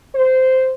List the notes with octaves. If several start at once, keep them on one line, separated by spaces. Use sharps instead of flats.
C5